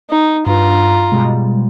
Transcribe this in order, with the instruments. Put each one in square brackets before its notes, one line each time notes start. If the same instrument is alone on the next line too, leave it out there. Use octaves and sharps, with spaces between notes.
[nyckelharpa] D#4
[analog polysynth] G2 [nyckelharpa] F4 A#5
[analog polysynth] B2 G3 G#3